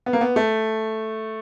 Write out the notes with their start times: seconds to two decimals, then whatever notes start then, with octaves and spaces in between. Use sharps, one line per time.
0.06 B3
0.13 A#3
0.21 B3
0.36 A3